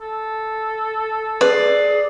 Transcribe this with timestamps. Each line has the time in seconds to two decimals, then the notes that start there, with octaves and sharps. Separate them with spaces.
0.01 A4
1.41 G#4 B4 D5